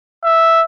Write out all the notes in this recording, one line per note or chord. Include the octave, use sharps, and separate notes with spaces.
E5